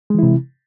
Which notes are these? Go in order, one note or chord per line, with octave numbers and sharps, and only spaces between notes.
C3 E3 G#3 E4